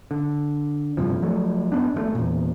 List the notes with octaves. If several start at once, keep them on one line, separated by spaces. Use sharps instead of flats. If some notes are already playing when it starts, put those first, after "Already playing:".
D3
D2 G2 C3 F3
F3 F#3 A3
F#2 B3 D4
G#1 C#3 A3
E2 A#2